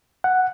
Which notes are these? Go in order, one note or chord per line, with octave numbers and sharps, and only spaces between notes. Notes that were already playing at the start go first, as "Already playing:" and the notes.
F#5